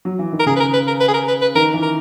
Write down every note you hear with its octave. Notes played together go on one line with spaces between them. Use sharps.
F#3
E3
D#3
A#4
C#3 G#4
B4
A#4
B4
A#4
B4
G#4
A#4
B4
B4
D#3 A#4
E3
A#4